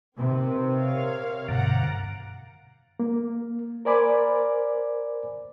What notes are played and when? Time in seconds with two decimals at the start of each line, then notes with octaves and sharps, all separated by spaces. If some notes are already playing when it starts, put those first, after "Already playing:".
0.18 C3 D#3 C4 B4
0.78 A#4 C#5 F5
1.48 G2 B2 D3 F5 F#5 A#5
3.00 A#3
3.85 A#4 C5 D5 G#5 B5 D6